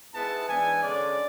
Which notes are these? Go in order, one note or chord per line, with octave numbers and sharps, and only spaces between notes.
G#2 G#3 B3 E4 A5
G#2 E3 B3 D4 G#5
D3 G#3 C#4 D5